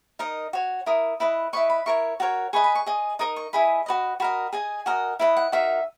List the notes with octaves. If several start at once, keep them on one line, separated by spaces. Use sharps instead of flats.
D#4 A#4 D#5
F#4 C#5
E4 A#4 D#6
E4 B4 D#5
E4 B4 D#5 C#6
B5
E4 A#4 C#5 C#6
F#4 A#4 C#5
G#4 B4 D#5 C#6
B5
C#6
G#4 D#5
D#4 A#4 D#5 D#6
C#6
E4 G#4 D#5 B5
F#4 B4 D#5
F#4 A#4 D#5 B5
G#4 D#5 G#5
F#4 A#4 D#5
E4 B4 D#5
F#5
D#4 F#4 A#4 E5